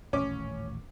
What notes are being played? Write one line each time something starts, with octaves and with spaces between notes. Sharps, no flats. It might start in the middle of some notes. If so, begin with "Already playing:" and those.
D#1 A1 A3 C#4 D6